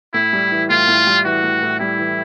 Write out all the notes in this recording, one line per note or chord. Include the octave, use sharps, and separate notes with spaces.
A2 E4
G3
E3
A2 F4
A2
G3
E3 F#4
A2
A2
G3 E4
E3